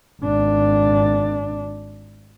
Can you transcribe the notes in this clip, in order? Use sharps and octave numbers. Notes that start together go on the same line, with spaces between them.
G#1 D4